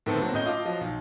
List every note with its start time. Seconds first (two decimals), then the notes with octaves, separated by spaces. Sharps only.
0.06 A2 D3 D#3 B3 C4 A4
0.22 F#3 A#3 C4 F#4
0.33 A2 C#4 D#5 G6 G7
0.46 F4 D#5 F5 A5 D6
0.65 F3 F#3 D#5 F5
0.81 B1